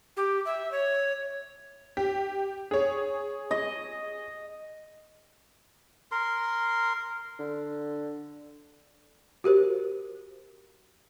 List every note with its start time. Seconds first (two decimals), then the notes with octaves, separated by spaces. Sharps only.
0.17 G4
0.45 E5
0.71 C#5
1.97 G4
2.71 G#4 C#5
3.51 D#5
6.12 A#4 C6
7.39 D3
9.44 F#4 G4 A#4 C5